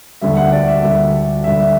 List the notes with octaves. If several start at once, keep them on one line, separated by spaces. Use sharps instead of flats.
D2 D3 G3 E5
F#5
D5
E5
D2 D3 G3
D2 D3 G3 E5